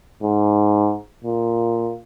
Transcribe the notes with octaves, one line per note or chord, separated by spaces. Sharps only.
G#2
A#2